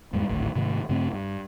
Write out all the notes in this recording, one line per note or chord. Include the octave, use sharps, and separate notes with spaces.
E2 G#2 G3 G#3
G#1 D2 A2 D3
G#2 C3 D#3 A3
G2 C#3 A3 C4
G2